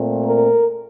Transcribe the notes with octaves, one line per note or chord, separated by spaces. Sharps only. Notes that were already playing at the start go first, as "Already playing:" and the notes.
Already playing: A#2 A3 C4
A#4